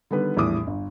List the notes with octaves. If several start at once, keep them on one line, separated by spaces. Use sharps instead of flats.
D3 D#3 G3 B3 B4
A#1 E2 A2 G3 D6 D#6
G1